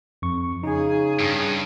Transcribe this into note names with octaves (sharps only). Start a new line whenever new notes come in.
F2 C#6
C#3 D#4 G#4
G2